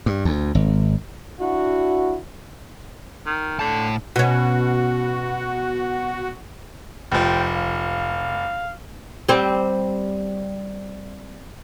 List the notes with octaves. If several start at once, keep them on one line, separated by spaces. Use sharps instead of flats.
G2
D2
G#1
D4 E4 F#4
D#3
A2 D3 A5
B2 C#4 F#4
F1 F3 G5
F5
G3 C4